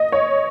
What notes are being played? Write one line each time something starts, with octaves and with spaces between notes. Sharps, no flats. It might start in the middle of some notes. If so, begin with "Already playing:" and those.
Already playing: D#5
C#5